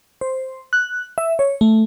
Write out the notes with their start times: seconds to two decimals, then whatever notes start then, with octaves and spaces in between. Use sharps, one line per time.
0.21 C5
0.73 F#6
1.18 E5
1.39 C#5
1.61 A3